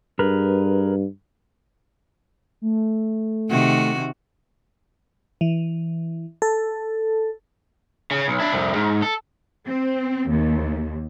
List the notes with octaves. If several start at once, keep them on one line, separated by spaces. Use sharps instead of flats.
G2 G#4 A#4 B4
A3
C3 D#3 F#4
E3
A4
C#3
B1
D4 E4
C2 F2
G#2
A4
C4
D#2